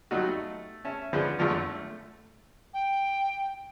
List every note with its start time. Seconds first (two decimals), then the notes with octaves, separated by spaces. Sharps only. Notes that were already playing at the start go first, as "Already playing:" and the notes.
0.11 F#3 G3 A3 D#4 F4 F#4
0.28 A3
0.85 C#4 E5 A5
1.13 D3 F3 G#3 C#4 B4 C5
1.39 G#1 F#2 D3 F3 D4 F4
1.50 A3
2.74 G5